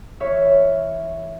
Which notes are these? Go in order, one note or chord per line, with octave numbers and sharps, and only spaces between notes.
E3 C#5 E5 F6